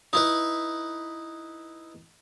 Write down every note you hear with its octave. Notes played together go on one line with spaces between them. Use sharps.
D#4 E4 B4